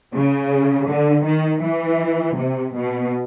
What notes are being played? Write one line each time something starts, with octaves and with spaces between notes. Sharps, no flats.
C#3
D3
D#3
E3
C3
B2